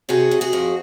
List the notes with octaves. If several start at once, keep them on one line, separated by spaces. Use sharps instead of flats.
C3 F#4 G#4
C3
F#4 G#4
F2